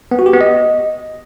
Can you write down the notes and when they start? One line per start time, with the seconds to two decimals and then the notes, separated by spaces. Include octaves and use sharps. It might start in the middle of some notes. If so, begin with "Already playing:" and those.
0.11 B3
0.19 F#4
0.26 G4
0.33 B3
0.41 D#5